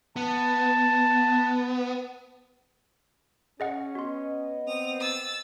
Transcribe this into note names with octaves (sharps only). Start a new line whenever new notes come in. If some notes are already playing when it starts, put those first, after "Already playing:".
B3 A5
C#4 G#4 D#5 F#5
B3 F#4 D#5 C6
C4 D#6 F7
E6 A6